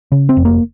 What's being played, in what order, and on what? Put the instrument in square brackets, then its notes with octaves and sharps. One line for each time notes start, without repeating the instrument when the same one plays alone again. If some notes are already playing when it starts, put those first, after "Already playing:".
[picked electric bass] C#3
C4
F1
A#3